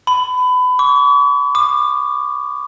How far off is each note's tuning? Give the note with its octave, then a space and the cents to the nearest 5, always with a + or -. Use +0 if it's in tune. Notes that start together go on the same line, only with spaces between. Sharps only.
B5 +25
C#6 +45
D6 +40